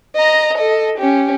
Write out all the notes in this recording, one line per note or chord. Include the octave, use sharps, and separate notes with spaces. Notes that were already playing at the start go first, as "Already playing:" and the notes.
D#5 A#5
A4 D#5
C#4 G4